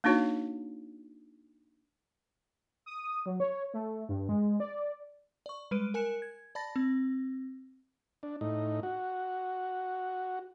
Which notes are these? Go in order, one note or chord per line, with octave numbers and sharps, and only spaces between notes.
A#3 D4 D#4 F#4 C#5
D#6
F#3
C#5
A3
G2
G#3
D5
D5 C#6
G3 G#3 B4 D7 D#7
A#4 G#5 F#6 C#7 E7
G#6
D5 A5 B5 A6 A#6
C4
D4
A2 D#4
F#4